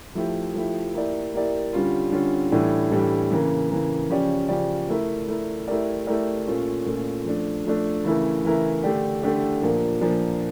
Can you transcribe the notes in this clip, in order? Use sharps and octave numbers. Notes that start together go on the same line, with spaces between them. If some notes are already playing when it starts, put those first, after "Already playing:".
F3 A3 E4 G4
F3 A3 E4 G4
A#3 E4 G4 D5
A#3 E4 G4 D5
D3 G3 C#4 F4
D3 G3 C#4 F4
A2 E3 G3 D4 A4
A2 E3 G3 D4 A4
C#3 E3 A#3
C#3 E3 A#3
C#3 F3 C#4 G4 D5
C#3 F3 C#4 G4 D5
A3 E4 A#4
A3 E4 A#4
A3 E4 G4 A#4 D5
A3 E4 G4 A#4 D5
A#2 A3 C#4 F4
A#2 A3 C#4 F4
F3 A3 D4
F3 A3 D4
C#3 E3 A3 E4 A#4
C#3 E3 A3 E4 A#4
D3 A3 D4 G4
D3 A3 D4 G4
A#2 F3 A#3 D4
A#2 F3 A#3 D4